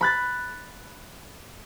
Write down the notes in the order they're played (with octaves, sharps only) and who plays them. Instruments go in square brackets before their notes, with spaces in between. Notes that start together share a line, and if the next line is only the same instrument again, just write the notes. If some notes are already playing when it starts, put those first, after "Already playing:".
[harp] B5 F#6 A6